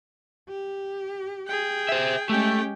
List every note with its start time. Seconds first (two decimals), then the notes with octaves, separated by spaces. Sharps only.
0.49 G4
1.48 G#4 G5
1.89 C5 E5
2.29 G#3 A3 C#4 G4 G5